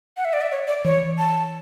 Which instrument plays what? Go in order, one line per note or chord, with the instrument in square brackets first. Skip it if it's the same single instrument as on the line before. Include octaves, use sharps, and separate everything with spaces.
[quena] F#5
E5
D5
E5
C#5
D5
[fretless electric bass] E3 [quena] C#5
[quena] A5